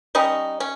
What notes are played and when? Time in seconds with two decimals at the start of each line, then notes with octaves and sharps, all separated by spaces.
0.15 G3 C#4 D#4
0.60 C#4